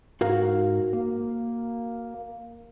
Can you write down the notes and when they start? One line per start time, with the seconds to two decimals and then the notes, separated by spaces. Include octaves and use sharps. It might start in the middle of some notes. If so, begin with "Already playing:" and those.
0.21 G#2 F#4 A#4 F5
0.93 A#3